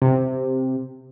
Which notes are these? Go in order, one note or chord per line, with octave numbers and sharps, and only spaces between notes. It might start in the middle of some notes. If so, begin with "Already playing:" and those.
C3